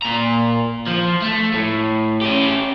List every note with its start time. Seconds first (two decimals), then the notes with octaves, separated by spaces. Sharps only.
0.02 A#2 A#5
0.87 F3
1.21 A3
1.54 A2
2.21 C#4 G4